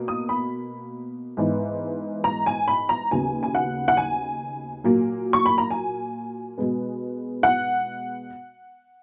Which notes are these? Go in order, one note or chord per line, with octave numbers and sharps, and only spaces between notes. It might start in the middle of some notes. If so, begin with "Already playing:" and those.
Already playing: B2 A#3
D#6
B5
G#2 E3 B3
A#5
G#5
B5
A#5
D#2 C#3 F#3 B3 G#5
G#5
F#5
F#5
G#5
A#2 F#3 A#3
C#6
B5
A#5
G#5
B2 G#3 B3
F#5